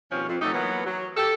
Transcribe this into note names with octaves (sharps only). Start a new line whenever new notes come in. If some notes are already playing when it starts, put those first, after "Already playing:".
D#2 B2 F3 C4 C#4 C#5
F2
C3 F#3 A3 D#4 G4 A4
E3 F#3 A#3 B3
F#3
G4 A4